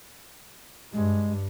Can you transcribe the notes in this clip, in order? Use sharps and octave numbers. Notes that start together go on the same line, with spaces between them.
G2 G#3